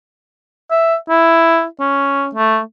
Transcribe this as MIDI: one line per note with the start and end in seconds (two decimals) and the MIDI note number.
0.71 0.95 76
1.09 1.65 64
1.80 2.28 61
2.35 2.60 57